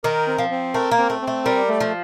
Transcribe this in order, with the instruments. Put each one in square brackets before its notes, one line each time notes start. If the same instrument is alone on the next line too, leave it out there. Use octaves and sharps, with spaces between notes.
[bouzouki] D#3 [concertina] A#4
[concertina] C4
[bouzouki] F3
[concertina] C4
[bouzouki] A3 [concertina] A#4
[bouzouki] A#3
[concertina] C4
[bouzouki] A3
[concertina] C4
[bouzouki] A3
[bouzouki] G3 [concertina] A#4
[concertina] A3
[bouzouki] F3